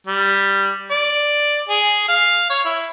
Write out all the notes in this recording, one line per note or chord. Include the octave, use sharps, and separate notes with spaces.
G3
D5
G#4
F5
C#5
E4